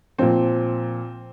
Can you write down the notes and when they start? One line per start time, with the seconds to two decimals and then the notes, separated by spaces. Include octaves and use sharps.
0.19 A#2 F3 C4